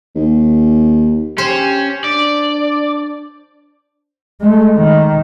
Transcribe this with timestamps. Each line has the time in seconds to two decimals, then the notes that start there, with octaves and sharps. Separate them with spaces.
0.15 D#2
1.38 C#4 G4 C5
2.04 D4 D5
4.41 G#3 A3
4.77 D#3